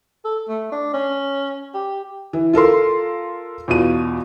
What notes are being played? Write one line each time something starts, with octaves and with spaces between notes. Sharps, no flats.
A4
A3
D4
C#4
G4
E3
F4 A4 A#4 C6
E2 B2 F4 D#7